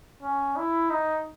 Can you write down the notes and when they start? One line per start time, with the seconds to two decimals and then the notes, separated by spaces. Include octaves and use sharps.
0.23 C#4
0.57 E4
0.90 D#4